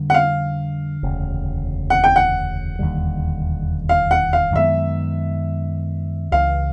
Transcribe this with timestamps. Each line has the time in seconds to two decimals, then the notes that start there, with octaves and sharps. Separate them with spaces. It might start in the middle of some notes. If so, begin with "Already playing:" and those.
Already playing: F2 D3 G3 A#3
0.10 F#5
0.14 F5
1.03 E1 D2 C#3
1.90 F#5
2.04 G5
2.16 F#5
2.79 E1 D#2 D3 G3
3.89 F5
4.11 F#5
4.33 F5
4.55 F#2 D#3 G#3 B3 E5
6.32 C#2 C#3 E3 F5